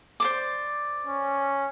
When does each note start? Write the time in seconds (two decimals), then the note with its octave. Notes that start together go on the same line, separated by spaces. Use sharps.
0.20 C5 D5 D6
1.07 C#4